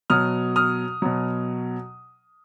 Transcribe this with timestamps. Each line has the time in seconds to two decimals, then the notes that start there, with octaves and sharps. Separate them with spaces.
0.10 B2 F#3 D#6 F6
0.56 D#6 F6
1.02 B2 F#3